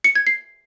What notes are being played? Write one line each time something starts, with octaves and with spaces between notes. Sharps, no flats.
C#7
G#6
C7